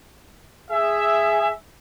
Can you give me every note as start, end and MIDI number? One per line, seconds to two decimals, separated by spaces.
0.71 1.48 68
0.71 1.48 76